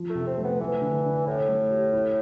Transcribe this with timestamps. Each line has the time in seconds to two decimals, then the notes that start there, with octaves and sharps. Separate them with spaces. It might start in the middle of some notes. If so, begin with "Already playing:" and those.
Already playing: F3
0.10 A3
0.15 C3
0.27 C4
0.38 A3
0.44 B3
0.60 E3 A3
0.82 D3
1.05 D4
1.27 A2 E4
1.49 A3
1.71 G4
1.93 E4